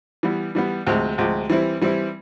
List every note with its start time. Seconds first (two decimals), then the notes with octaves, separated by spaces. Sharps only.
0.23 E3 G3 B3
0.55 E3 G3 B3
0.87 D2 C3 F3 G#3
1.18 D2 C3 F3 G#3
1.49 E3 G3 C4 E4
1.81 E3 G3 C4 E4